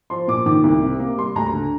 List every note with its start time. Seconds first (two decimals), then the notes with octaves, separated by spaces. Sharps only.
0.10 F3 C6
0.28 A#2 D6
0.46 D#3 D6
0.64 C2
0.82 C3
1.00 A#3
1.18 G3 C6
1.35 D2 A#5
1.53 D3